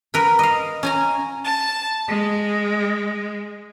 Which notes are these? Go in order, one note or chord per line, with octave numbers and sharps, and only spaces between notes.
A#4 B4
D#5 F5
C#4 G#5 A#5
A5
G#3